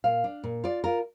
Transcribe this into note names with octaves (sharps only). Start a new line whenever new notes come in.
A#2 F5
D4
A#2
F4 D5
F4 A#4